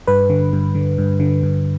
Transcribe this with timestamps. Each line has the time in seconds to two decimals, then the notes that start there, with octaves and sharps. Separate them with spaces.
0.07 G2 B4
0.30 D3
0.53 G2
0.75 D3
0.98 G2
1.20 D3
1.43 G2